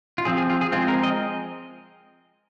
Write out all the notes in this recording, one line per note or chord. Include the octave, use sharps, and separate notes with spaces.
F4
F3 C4 G#4
G#4
F4
G#4
F3 G#3 C4 F4
A#4
D#5